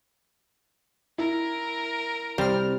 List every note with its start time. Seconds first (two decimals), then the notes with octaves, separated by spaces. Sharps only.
1.18 E4 A#4
2.38 C2 G3 C4 F6